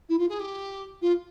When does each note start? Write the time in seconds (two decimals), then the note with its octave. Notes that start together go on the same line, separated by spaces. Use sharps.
0.09 E4
0.18 F4
0.29 G#4
0.39 G4
1.01 F4